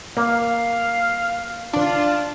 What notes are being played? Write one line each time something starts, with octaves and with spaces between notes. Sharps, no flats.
A#3 F5
D4 F4